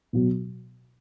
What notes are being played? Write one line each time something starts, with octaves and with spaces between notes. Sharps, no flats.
B2 F#3